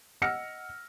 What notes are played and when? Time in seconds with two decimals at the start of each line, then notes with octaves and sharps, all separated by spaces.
0.22 D#5 F#5 E6 F6 A#6 C#7